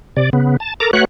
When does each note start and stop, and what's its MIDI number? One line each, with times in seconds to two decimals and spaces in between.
0.17 0.30 48
0.17 0.30 74
0.33 0.57 49
0.33 0.57 59
0.60 0.74 81
0.80 0.91 69
0.80 0.91 70
0.80 0.91 82
0.80 0.91 86
0.93 1.05 57
0.93 1.05 66
0.93 1.05 71
0.93 1.05 73
0.93 1.05 78
0.93 1.05 90